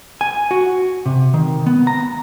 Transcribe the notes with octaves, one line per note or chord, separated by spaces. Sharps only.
G#5
F#4
C3
D#3
B3
A#5